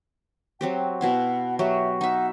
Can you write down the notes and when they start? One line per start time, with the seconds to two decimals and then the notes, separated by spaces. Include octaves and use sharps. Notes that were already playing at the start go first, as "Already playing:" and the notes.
0.61 F#3 C4 G4 G5
1.01 B2 E4 F5 F#5
1.59 F#3 F#4 G4 E5
2.01 D#4 E5 F#5